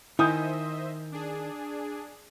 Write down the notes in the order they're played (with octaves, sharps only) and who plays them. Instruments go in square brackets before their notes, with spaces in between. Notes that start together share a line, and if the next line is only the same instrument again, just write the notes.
[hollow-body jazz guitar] D#3 [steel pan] E4 [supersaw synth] C5 D#5 E5 [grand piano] G#5 D#6 G6
[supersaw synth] D4 G#4